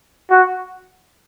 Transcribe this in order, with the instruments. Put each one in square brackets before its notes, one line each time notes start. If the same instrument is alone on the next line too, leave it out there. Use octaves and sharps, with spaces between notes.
[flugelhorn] F#4